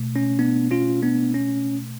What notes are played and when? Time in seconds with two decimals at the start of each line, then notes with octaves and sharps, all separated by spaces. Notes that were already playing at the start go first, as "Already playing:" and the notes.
Already playing: B2 A3
0.16 C#4
0.39 B3 D4
0.71 C#4 F4
1.02 B3 D4
1.34 C#4